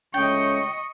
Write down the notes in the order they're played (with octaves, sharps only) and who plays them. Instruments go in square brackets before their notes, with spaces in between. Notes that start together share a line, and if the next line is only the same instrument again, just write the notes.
[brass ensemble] C#2 A3 C#4 [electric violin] D#5 C#6 [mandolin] G5